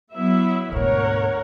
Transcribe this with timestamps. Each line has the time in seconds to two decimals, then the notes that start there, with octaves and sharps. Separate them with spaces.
0.15 F#3 B3 E4 E5
0.72 D2 G#2 B2 A#4 C#5 F#5